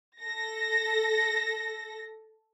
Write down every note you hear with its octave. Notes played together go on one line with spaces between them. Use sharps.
A4 A#6